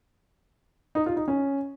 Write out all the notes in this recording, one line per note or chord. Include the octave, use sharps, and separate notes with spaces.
D#4
F4
D#4
C#4